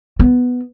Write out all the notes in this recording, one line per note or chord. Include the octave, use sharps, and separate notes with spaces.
B3